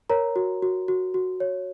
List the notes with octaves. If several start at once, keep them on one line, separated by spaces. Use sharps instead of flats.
A#4 C#5 A#5
F#4
F#4
F#4
F#4
C#5